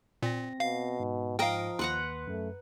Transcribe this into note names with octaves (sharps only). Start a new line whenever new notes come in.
A#2 C4 A#6
B2 F5
G#2
F3 A#4 D#5 F5 G5 A#5
D#2 B4 F#5 A#5 C6
F#2 A3